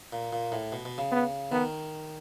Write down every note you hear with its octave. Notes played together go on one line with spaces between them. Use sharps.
A#2
A#2
A2
B2
B2
C#3
B3
D#3 B3